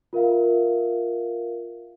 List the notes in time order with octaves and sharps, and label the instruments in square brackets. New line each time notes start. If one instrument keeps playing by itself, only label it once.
[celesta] F4 A#4 E5 F5